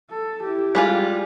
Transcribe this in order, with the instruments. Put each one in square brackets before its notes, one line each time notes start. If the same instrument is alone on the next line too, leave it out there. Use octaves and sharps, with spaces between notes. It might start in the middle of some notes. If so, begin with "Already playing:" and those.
[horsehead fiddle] A4
E4 G4
[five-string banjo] G3 G#3 F4